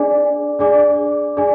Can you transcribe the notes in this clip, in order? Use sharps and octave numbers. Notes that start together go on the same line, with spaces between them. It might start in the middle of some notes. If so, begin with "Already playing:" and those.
Already playing: D4 G#4 D5 G#5 D6
D4 G#4 D5 G#5 D6
D4 G#4 D5 G#5